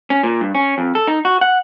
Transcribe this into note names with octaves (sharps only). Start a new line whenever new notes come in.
C#4
A#2
G2
C#4
F2
A4
D#4
F#4
F#5